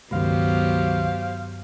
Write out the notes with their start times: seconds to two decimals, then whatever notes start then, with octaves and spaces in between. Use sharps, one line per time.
0.11 C#2 G2 D#3 F#3 B3 G4 C5 F5